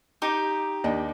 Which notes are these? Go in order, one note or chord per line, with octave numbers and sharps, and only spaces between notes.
D#4 G4
D#2 D4 D#5